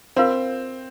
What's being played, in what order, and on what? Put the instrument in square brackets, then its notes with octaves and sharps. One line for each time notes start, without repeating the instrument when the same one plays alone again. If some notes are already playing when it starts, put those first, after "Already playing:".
[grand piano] C4 [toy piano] F4 A#4 F5 C6